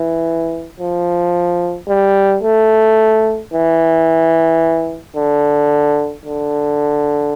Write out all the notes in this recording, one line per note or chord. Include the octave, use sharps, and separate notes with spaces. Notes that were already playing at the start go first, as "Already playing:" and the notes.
Already playing: E3
F3
G3
A3
E3
D3
D3